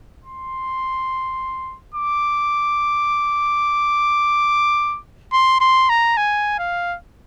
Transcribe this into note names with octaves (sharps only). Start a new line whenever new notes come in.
C6
D6
C6
C6
A#5
G#5
F5